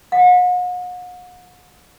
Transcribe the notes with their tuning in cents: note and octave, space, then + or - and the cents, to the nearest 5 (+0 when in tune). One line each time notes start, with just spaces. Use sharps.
F#5 -45